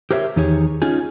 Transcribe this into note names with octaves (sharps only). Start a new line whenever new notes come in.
G4 A#4 C5 C#5 E5
E2 D#3 D#4 G4 G#4 C#5
C#4 D#4 F4 G#4